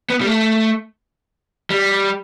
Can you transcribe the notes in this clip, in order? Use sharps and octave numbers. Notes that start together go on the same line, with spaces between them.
B3
G3
A3
G3